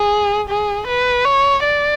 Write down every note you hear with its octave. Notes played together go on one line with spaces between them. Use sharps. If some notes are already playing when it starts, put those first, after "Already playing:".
Already playing: G#4
G#4
B4
C#5
D5